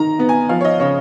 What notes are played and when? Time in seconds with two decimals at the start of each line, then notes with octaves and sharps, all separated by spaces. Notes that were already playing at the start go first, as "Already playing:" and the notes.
Already playing: D#3 D#4 A#5
0.19 B3
0.29 G#5
0.49 F3 F5
0.61 C#5
0.65 D#5
0.80 C#3 C#5